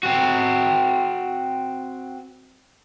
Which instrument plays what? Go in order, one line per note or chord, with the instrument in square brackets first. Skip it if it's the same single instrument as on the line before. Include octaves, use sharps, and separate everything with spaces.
[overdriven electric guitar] C4 F#4